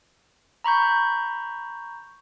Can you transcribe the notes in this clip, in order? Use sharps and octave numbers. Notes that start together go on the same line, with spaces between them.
A#5 B5 C#6 G6